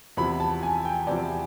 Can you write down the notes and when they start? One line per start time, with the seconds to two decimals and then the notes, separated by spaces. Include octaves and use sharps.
0.17 E2 C3 F3 B5
0.40 A5
0.63 G#5
0.85 G5
1.07 E2 C3 F3 D5